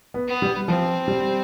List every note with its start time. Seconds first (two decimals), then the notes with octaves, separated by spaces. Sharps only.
0.14 B3
0.28 B3
0.42 G3
0.68 F3 C4
1.08 G3